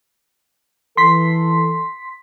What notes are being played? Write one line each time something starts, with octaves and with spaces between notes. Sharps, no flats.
E3 A4 C6 B6